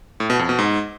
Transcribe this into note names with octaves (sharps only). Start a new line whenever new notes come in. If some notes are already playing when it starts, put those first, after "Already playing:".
A2
B2
F2
B2
G#2